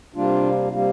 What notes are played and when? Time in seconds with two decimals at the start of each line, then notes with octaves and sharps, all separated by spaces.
0.15 C3 G3 A#3 D4 F4
0.71 C3 G3 A#3